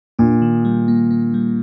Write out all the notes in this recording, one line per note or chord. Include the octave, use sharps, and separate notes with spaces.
A#2 D4
D#3
G3
A#3
A#3
G3